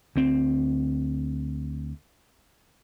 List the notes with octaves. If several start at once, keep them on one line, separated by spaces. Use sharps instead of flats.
D2 C4